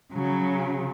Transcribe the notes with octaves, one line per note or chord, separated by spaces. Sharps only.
C#3 F#3